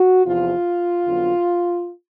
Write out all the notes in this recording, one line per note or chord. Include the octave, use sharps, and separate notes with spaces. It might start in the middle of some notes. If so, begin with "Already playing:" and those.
Already playing: F#4
E2 C3 F3 F4
F2 D3 F#3 B3